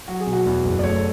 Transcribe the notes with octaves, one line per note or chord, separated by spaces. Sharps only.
F#3 F#4
G#4
B2
F#4
E2
F#1
D5
A3 C#5